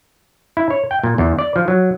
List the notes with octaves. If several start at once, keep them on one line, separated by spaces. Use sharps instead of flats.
E4
C#5
G5
A#2
E2
D5
F3
F#3